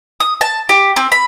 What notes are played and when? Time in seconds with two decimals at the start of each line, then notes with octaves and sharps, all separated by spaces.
0.20 D#6
0.41 A5
0.69 G4
0.96 C4
1.12 B5